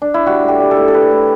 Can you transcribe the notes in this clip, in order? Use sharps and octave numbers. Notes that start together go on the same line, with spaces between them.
D4
E4
G3 F#4
A2
G4
G3
A4
A2
A4
G3 B4
A2